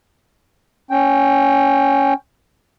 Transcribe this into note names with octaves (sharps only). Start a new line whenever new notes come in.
C#4 G5